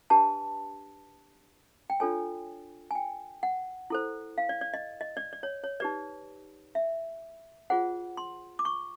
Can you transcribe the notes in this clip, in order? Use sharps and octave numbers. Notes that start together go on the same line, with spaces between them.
D4 G4 B4 A5
G5
D4 F4 A4 C#5 G#5
G#5
G5
F#5
E4 A4 C5
F5
D5
D5
D#5
D#5
D5
D5
C#5
C#5
D#4 G4 B4 D5
E5
F4 G#4 C5 F#5
C6
D6
C#6